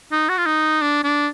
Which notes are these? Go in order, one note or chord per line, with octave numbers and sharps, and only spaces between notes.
D#4
F#4
F4
D#4
D4
D4